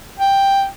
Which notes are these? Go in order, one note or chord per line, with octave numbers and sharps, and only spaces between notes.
G5